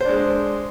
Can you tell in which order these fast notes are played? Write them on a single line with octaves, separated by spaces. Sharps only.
C5 D4 G#3